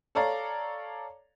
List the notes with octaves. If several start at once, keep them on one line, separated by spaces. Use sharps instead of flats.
A4 C#5 D5 F5 A#5